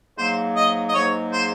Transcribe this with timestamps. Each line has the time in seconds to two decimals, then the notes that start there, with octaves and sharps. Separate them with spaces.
0.18 G#2 F#3 A#3 C5
0.55 D#5
0.89 D#5
0.94 G#2 F#3 A#3 C#5
1.33 C5